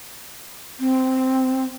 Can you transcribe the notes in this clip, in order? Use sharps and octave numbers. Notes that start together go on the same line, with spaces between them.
C4